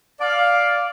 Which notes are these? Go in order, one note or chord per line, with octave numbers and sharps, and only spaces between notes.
D5 F5